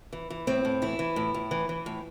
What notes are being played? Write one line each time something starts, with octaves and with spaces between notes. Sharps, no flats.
E3
E3
A2 C4
A2
E3 E4
E3
A2
A2
E3
E3
A2